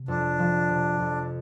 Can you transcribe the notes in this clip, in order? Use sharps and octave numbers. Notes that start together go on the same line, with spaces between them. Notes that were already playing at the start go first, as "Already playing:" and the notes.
Already playing: C3
F2 D4
F3
C3
F2